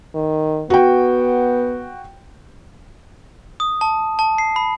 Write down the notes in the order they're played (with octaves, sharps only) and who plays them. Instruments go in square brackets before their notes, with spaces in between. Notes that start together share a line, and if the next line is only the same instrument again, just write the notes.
[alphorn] D#3
[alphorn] B3 [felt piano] F#4 G5
[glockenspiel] D#6
A5
A5
C7
B5